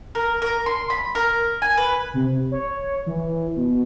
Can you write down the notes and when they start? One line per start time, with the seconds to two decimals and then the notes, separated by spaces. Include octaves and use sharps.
0.15 A#4
0.42 A#4
0.66 C6
0.90 B5
1.15 A#4
1.62 G#5
1.77 B4
2.14 C3
2.52 C#5
3.06 E3
3.56 B2